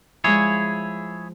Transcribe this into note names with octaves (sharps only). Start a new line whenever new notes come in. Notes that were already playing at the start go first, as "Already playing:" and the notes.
F3 G#3 E4 G#4 C#5